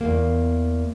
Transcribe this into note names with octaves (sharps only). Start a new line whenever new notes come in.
E2 G#2 A#3